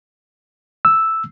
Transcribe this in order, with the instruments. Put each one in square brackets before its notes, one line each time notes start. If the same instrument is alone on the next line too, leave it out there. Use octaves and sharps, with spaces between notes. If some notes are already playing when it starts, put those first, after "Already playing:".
[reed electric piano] E6